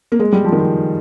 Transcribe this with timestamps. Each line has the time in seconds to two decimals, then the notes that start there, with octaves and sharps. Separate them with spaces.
0.12 A#3
0.20 G#3
0.32 G3
0.44 F3
0.52 D#3
0.59 F3